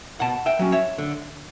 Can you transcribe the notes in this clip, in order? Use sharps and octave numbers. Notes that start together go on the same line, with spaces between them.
B2 F#5 A5
E5 G5
F#3 C#4
C#5 E5
D3